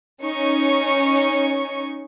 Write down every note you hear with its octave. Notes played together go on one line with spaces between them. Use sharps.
C#4 D#4 C#6 C#7